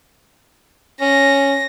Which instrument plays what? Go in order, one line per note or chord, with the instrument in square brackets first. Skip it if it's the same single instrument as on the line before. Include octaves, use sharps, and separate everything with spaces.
[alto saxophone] C#4 [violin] A#6